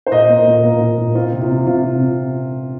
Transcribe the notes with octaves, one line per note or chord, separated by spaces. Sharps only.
C5
A#2 D#5
A#3
A#2
A#3
A#2
A#2
C4 F4
C3
F4
C3
C3 F4
C3